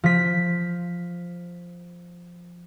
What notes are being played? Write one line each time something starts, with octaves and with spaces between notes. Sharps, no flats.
F3 B6